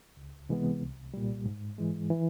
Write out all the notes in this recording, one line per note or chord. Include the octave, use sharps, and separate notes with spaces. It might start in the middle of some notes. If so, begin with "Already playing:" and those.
C#2
C3 E3 G#3 B3
C2
A#2 G3
G#2
E3 G#3
E3